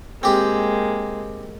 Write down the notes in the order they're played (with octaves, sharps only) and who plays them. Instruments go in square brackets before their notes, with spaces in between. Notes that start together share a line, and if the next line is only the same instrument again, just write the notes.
[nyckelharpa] G#3 A#3 [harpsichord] C4 G4